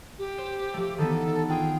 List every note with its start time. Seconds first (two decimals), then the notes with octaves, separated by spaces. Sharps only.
0.19 G4
0.38 C5
0.74 F3 A3
0.98 D#3 E3 B3 A4
1.49 D4 F4 G#4 G5